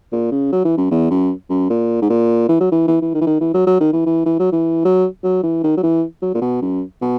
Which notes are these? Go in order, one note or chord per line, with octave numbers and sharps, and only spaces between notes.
A#2
C#3
F#3
E3
F#2
E2
F#2
F#2
A#2
G#2
A#2
E3
F#3
E3
E3
E3
D#3
E3
D#3
E3
F#3
F#3
D#3
E3
E3
E3
F#3
E3
F#3
F#3
E3
D#3
F#3
E3
F#3
A#2
B2
F#2
B2